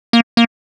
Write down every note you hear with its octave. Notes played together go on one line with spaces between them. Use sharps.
A#3
A#3